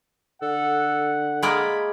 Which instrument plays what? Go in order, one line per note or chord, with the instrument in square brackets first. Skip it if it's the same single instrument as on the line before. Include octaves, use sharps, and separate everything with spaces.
[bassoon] D3 [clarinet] A4 [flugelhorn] F#5
[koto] G#3 A#3 D5 [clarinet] B5